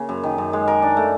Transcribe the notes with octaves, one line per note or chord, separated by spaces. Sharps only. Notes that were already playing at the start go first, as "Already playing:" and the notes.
Already playing: C#3 A#3
F#2
D#3
F#2
G#3
A#4
D4
A3